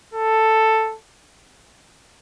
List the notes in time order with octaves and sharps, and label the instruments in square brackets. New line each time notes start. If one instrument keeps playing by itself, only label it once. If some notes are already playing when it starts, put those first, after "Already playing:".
[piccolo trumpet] A4